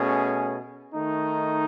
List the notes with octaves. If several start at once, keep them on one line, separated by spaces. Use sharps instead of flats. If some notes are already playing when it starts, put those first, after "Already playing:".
Already playing: B2 A3 C#4 G#4
D#3 A3 D#4